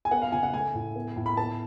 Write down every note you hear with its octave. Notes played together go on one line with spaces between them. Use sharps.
G#5
B3 F#5
F5
C#3 G#5
F#5
A3 G#5
A2
B3
A2
B5
B3 A5